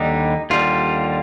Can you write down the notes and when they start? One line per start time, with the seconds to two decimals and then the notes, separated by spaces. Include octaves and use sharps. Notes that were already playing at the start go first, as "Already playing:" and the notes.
Already playing: D#2 D3 G3 D#4
0.50 D#2 D3 G3 F4